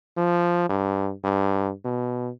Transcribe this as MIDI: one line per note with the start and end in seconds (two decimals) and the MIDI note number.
0.17 0.66 53
0.69 1.12 43
1.24 1.72 43
1.85 2.30 47